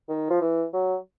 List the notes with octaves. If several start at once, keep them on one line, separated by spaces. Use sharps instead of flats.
D#3
F3
E3
F#3